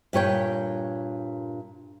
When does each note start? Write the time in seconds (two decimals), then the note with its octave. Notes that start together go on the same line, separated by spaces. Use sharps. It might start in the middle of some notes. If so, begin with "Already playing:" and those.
0.13 G2 A#2 C#5 G5